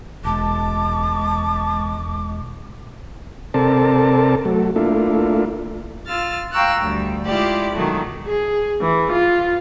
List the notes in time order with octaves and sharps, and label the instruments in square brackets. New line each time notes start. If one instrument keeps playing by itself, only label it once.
[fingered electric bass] E1 [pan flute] G#3 [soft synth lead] A5 [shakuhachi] D6
[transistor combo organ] C3 C4 A4 A#4 D5 A5
F#3 A3
A3 A#3 D4 E4 F4
[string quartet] F4 E6 F6 A6
F5 G5 A#5 C#6 E6 F#6
D2 G3
G#3 E4 F4 G4 D5
B2 D#3 F#3 G#3 A3
[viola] G#4
E3
F4